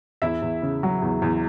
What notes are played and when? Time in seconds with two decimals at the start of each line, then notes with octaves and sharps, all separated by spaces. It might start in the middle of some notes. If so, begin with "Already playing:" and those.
0.22 E2 E4 E5
0.42 E2
0.62 C#3
0.83 F#3
1.02 E2
1.22 E2